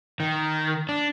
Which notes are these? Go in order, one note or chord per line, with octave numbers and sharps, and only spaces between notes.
D#3
D4